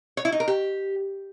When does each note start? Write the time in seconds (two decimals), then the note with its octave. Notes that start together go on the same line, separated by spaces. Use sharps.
0.17 C#5
0.25 E4
0.32 D#4
0.40 A#4
0.48 G4